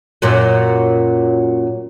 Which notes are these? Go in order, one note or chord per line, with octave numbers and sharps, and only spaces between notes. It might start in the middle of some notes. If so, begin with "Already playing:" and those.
F#2 A#2 F#3